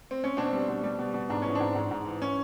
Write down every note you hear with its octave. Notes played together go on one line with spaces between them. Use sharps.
C4
C#4
B2 C4 D4
G3
B2
G3
B2
B2
G#2 D4
E3 C#4
C4 D4
G#2
G#2
G#2
E3
C#4